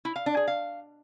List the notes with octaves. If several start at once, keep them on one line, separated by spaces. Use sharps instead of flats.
E4
F5
D4
G#4
F5